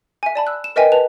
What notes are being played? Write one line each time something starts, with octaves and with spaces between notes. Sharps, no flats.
E5 G#5
D5 A5 B5
E6 F#6
E7
A#4 B4 D#5 E5 G5 G#5
B4 A5 F7